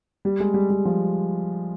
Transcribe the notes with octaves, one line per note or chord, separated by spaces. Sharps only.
G3
G#3
G3
G3
F3